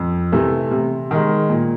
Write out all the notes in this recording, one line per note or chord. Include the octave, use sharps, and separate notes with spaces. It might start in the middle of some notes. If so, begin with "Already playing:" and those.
Already playing: F2
C3 E3 A3
C3
D#3 G#3
A#2